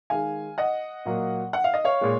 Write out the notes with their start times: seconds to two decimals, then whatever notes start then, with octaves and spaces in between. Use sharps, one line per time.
0.10 D#3 G#3 F5 G#5
0.58 D#5 F#5
1.05 A#2 F#3 A#3
1.53 F#5
1.64 F5
1.74 D#5
1.85 C#5 F5
2.01 A#2 G#3